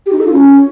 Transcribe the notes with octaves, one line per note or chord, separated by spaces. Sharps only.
G4
D#4
A4
F4
C#4